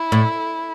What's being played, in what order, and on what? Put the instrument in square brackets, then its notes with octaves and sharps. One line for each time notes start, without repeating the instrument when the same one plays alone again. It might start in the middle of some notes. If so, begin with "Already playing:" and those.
Already playing: [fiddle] E4
[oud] A2